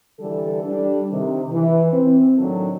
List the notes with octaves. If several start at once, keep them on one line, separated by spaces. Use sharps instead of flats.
D3 E3 G3 A4
G3 D4
C3 D#3
E3
C4
A2 D#3 F#3 D4 A4